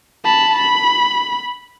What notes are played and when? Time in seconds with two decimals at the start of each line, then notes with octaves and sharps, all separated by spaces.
0.25 A5 B5
0.58 B5